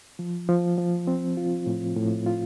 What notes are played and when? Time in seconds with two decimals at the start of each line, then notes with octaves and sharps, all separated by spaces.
0.19 F3
0.49 F3
0.78 F3
1.07 C4
1.37 F4
1.66 A2
1.96 A2
2.26 F4